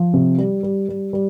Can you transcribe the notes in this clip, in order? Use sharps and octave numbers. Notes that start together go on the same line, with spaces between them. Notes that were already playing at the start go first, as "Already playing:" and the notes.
Already playing: F3
C3
G3
G3
G3
G3